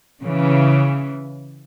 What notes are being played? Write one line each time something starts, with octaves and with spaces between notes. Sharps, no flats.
C#3 E3